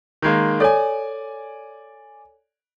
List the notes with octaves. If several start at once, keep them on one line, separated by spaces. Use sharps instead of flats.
D#3 G#3 A#3
A4 C#5 D5 G#5